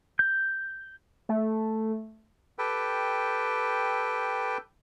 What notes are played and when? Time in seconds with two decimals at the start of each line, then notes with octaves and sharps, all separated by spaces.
0.19 G6
1.29 A3
2.59 G4 A4 B4 G5